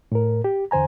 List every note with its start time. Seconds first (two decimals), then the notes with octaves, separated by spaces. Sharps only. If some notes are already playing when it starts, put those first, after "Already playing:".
0.12 A2 A#4
0.44 G4
0.71 E2 D3 C5 G#5 A#5